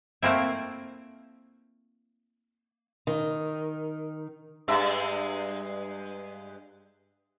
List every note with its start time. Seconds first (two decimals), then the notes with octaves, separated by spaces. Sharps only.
0.22 A3 A#3 C4 E4
3.07 D#3
4.68 G2 G#3 E5